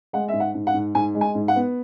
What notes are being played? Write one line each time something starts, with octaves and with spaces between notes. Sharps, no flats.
G#3 F#5
G#2 E5
F#5
G#2
F#5
G#2
G#2 G#5
G#3
G#5
G#2
F#5
B3